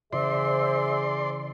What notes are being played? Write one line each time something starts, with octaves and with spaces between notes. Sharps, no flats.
C#3 E3 G#4 C5 D5 E5 C6 E6